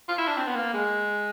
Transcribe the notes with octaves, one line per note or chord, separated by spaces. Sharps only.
F4
E4
D4
C4
B3
A#3
G#3